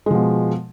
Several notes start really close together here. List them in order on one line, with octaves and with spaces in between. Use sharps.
G#3 F3 B2